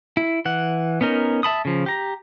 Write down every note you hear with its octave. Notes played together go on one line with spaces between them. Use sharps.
E4
E3 F#5
B3 C#4 D#4 A#4
E5 A5 B5 D#6
C#3 F3
G4 A#5